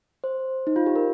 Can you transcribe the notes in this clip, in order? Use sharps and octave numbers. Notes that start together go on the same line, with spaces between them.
C5
D#4
F4
G4
A#4